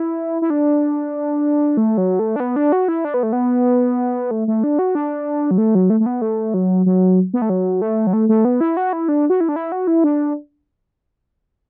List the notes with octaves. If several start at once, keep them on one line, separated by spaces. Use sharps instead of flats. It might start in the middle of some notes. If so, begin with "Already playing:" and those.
Already playing: E4
E4
D4
A3
F#3
A3
D4
B3
D4
F#4
E4
D4
B3
A3
B3
A3
A3
D4
F#4
D4
F#3
A3
F#3
A3
A3
B3
A3
F#3
F#3
B3
A3
F#3
A3
F#3
A3
A3
B3
E4
F#4
E4
D4
F#4
E4
D4
E4
F#4
E4
D4